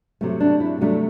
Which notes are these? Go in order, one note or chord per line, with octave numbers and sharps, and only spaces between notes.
C3 F#3 A3
D4
E4
C3 F#3 A3 D4